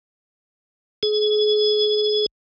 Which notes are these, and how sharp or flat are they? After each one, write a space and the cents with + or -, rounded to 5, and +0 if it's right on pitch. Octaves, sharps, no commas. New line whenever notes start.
G#4 +30